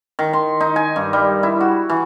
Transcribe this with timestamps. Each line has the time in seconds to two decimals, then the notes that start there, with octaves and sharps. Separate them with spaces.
0.19 D#3
0.33 C6
0.61 D#4
0.76 G#5
0.96 G2
1.13 G3
1.43 E4
1.61 F#4
1.89 E3